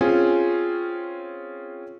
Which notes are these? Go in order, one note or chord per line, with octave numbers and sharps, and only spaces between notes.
C4 C#4 F4 G#4 G#5